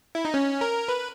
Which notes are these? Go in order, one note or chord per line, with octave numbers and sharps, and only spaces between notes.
E4
D#4
C#4
A#4
B4